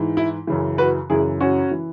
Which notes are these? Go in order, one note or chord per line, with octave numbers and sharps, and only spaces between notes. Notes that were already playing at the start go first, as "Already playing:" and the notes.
Already playing: G#2 E3
E4
F#2 C#3 E3
F#4 B4
F#2 C#3 E3 E4 G#4
C#4 F#4
E3